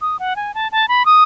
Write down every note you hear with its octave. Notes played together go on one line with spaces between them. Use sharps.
D#6
F#5
G#5
A5
A5
B5
D#6